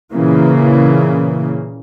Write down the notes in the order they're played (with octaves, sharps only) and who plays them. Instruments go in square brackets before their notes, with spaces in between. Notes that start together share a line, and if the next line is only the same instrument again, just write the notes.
[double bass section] A#2 C#3 E3 A#3